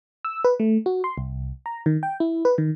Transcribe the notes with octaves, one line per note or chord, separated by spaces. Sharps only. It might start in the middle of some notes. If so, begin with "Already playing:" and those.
E6
B4
A3
F#4
C6
C2
A#5
D#3
G5
E4
B4
D#3